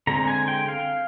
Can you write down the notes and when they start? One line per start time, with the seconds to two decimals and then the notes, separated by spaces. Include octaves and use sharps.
0.07 D3 G#3 C4 A#5
0.28 G#5
0.48 G5
0.68 F5